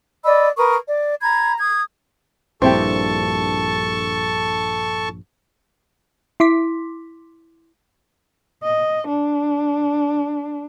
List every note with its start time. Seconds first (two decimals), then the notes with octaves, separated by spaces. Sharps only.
0.24 D5 D#5 B5 E6
0.57 A#4 B4 C#6 D#6
0.86 D5
1.21 A#5 B5 G#6
1.59 D#6 G#6
2.62 A#1 G2 C4 E4 G4 A4 A5 C#6
6.40 E4 C6 D6 B6
8.64 D#5
9.08 D4